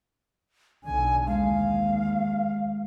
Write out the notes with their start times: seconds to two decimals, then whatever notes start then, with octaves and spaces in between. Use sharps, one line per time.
0.84 B1 D3 G#5
1.27 D#2 G#3 F5